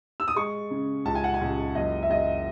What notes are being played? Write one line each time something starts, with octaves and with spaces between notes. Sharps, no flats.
E6
D#6
G#3 C#6
C#3
C#2 A5
G#5
F#5
G#5
C#2
F#1 D#5
E5
F#1 D#5